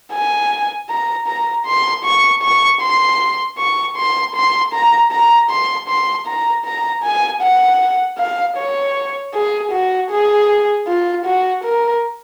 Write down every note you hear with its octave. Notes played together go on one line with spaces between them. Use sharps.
G#5
A#5
A#5
C6
C#6
C#6
C6
C#6
C6
C6
A#5
A#5
C6
C6
A#5
A#5
G#5
F#5
F5
C#5
G#4
F#4
G#4
F4
F#4
A#4